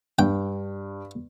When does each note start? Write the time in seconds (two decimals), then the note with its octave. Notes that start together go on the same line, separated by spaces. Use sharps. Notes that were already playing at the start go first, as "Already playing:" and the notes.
0.19 G2 G5